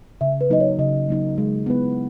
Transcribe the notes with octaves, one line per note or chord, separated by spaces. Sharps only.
C#3 E5
B4
F#3 A#3 D#4 D#5
C#5
C#3 D#5
F#3 A#3 D#4
G#3
B3 E4 B4